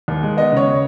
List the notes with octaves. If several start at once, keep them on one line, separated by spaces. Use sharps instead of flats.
D#2
G#3
B3 D#5
C#3 C#5